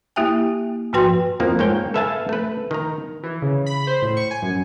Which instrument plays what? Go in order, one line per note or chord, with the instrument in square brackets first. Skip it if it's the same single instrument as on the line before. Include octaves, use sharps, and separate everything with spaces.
[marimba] A#3 E4 G4 E5 G5 G#5
G#2 F3 F#4 B4 G5 C6
[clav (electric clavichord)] F2 E3 F3 A#3
G#2 A#3 C#5 G5
A4 B4 E5 F5 G#5 A5
A3 B4
D#3 A#5
[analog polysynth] E3
C#3
B5
C5
A2
C#6
G#5
F#2